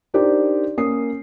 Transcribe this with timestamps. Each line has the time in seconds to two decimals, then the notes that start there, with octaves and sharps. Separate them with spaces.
0.14 D4 D#4 G4 A#4 C5 D5
0.77 A#3 C#4 D#6 C7